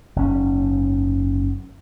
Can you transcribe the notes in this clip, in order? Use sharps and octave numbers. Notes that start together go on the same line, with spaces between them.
F#1 G#2 C#4